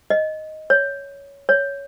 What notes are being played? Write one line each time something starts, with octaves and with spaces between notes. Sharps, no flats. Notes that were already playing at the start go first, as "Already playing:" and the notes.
D#5
C#5
C#5